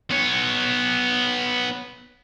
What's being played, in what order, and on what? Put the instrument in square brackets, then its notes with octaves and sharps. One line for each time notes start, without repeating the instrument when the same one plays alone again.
[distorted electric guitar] B3 C#5